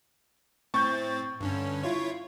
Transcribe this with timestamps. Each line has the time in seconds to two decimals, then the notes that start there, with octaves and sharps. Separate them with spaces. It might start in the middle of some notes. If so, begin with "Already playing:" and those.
0.74 A2 C4 C#6 G6 A6
1.41 G2 D3 C#4
1.83 E4 F4 C#5